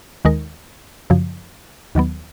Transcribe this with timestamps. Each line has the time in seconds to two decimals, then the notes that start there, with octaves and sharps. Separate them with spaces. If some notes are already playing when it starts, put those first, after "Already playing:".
0.25 D#2 D#3 G#3 D#4 A#4
1.10 F#2 C#3 F3
1.95 D#2 D#3 F#3 B3